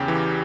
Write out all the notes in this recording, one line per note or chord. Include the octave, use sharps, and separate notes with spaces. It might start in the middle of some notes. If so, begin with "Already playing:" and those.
Already playing: E2 C#3 G4
E3